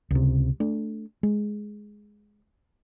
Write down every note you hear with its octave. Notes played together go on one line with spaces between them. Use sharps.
C#2 C3
A3 D4
G#3